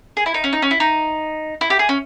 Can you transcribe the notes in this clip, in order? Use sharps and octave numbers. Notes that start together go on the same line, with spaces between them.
G#4
E4
D#4
C#4
D#4
C#4
E4
D#4
E4
G4
G#4
C#4